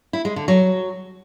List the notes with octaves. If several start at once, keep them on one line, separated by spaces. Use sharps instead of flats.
E4
G#3
D3
F#3